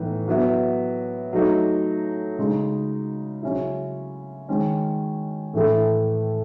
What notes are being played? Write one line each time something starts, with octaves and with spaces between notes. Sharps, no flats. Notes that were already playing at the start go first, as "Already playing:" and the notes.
Already playing: A2 E3 B3 D#4
F#3 B3 E4
F#3 A3 D#4
C#3 G#3 D#4
C#3 F#3 C#4 E4
D#3 G#3 C#4
A2 E3 A3